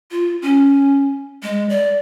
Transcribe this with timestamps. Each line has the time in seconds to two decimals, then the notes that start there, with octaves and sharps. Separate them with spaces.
0.11 F4
0.42 C#4
1.43 G#3
1.69 D5